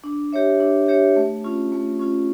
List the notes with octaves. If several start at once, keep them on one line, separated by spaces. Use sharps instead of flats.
D4
G4 C#5 E5
D4
G4 C#5 E5
A3
C#4 F4
A3
C#4 F4